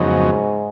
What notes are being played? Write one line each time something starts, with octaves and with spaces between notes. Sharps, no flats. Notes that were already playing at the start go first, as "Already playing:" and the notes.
Already playing: F2 G#2 C#3 F#3 B3 D#4